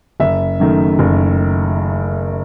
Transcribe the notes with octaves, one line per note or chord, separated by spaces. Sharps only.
F#1 E5
F#2 D#3 A3
F#1